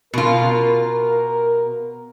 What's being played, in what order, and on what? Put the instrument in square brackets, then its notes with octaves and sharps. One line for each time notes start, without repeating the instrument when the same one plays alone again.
[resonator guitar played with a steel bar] B2 F4 [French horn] A#4